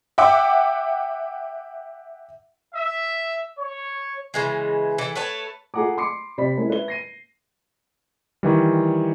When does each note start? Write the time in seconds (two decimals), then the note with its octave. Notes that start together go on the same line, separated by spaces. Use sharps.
0.18 E5 F#5 G5 D6
2.74 E5
3.58 C#5
4.34 C#3 E3 G#3
4.98 E3 A4
5.15 A3 B4 C#5 A5
5.74 F4 G#4 A4 F#5 A#5 D6
5.97 B5 C6 D6 C7 C#7
6.38 C3 C4 G4 D5 B5 B6
6.57 G#3 A#3 C4 C#4 E4
6.70 B4 E5 G7
6.88 A#6 C7 D#7
8.43 D#3 E3 G3